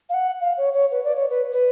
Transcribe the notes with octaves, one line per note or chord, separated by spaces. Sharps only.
F5
F#5
F5
C#5
C#5
B4
D5
C#5
B4
B4